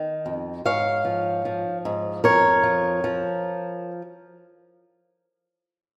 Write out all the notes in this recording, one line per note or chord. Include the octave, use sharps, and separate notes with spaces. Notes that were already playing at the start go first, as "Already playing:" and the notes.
Already playing: D#3
F2
G#2 C#5 F5
F3
F3
G#2
F2 A#4 C#5
F3
F3